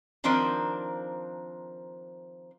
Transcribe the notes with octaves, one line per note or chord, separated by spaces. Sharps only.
D#3 F3 C4 D4 A#4 C5